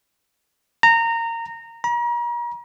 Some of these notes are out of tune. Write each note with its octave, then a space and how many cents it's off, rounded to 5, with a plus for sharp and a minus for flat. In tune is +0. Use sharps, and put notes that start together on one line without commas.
A#5 -20
A#5 +40